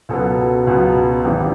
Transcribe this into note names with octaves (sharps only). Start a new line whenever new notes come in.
C#2 B2 F#3 B3 A4
C#2 B2 F#3 B3
G#1 G#2 E3 G4